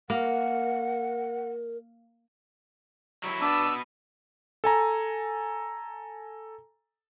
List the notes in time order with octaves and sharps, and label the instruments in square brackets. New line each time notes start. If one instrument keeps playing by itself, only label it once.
[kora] A#3 [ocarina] A#4 [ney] F#5
[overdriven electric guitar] F#3 E4
[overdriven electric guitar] B2 B4 [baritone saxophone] D4 [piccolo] E6
[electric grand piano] A4 G#5 A#5